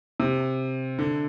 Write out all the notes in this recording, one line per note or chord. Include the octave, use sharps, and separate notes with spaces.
C3
D3